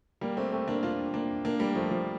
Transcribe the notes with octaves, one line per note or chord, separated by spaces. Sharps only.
G3 A#3
A3 C4
A3 C4
A#3 D4
D4 F4
A#3 D4
A#3 D4
G3 A#3
F3 A3
F3